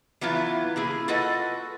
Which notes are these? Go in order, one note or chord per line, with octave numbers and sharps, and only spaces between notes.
E3 F#3 B3 E4 F4
A#3 E4 G#4
F4 F#4 A4 B4 D#5 F#5